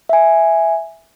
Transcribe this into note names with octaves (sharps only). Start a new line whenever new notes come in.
E5 G#5